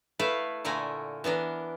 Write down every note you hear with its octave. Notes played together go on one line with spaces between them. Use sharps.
A3 E4 B4 F5
A#2 D3 A3 A#4 G#5
E3 B3 D4 A#4